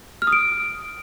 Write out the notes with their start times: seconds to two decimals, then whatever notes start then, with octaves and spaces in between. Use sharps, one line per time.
0.22 F6
0.27 D#6
0.33 D7